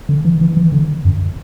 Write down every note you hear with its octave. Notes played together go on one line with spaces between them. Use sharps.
D3
E3
E3
E3
D3
F#2